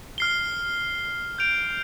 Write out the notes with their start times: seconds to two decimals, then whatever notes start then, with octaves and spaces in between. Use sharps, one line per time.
0.18 F6 C7 G7
1.38 G6 D7 F7